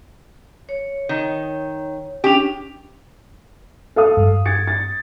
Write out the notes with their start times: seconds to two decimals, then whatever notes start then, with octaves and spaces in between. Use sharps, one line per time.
0.69 C#5
1.09 D#3
2.24 C#4 D4 G4
3.96 A4 F5 D#6
4.17 G2 G3
4.46 G#6 A6 C#7
4.67 A6